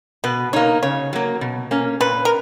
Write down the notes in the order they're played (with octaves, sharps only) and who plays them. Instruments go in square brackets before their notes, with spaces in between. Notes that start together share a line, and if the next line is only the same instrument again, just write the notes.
[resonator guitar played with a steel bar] B2 [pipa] B4
[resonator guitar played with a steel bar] A#3 D#4 [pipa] C#5
[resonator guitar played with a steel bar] C#3 [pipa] C#5
[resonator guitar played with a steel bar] F#3 A#3
B2
A#3 C#4
[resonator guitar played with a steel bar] A#2 [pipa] B4
[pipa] A#4